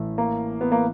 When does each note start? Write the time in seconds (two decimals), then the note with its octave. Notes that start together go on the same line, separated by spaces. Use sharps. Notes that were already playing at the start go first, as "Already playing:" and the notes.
Already playing: A1 A2 E3 A3
0.18 A#3
0.61 B3
0.72 A#3